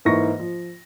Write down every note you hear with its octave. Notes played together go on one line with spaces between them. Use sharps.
G#2 E3 A#3 C#6 A#6
F3